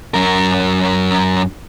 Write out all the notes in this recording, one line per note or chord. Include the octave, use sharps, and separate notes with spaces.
F#2 A#4